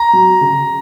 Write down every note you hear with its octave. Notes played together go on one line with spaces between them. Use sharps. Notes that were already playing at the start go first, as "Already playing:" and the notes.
Already playing: A#5
F#3
C#3